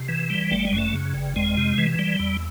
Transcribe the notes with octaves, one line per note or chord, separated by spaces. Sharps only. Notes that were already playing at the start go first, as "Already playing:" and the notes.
Already playing: C3
E3
G3
G1 A3
G#3
F#2
A3
C#3
G1
F2 G#3
C3
E3
G3
E2